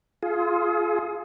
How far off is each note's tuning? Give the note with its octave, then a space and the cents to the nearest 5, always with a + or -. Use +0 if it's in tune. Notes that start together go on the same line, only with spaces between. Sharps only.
F4 -5 G#4 +30